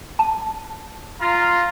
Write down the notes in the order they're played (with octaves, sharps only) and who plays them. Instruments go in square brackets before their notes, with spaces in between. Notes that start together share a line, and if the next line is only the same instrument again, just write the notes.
[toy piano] A5
[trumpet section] F4 A#5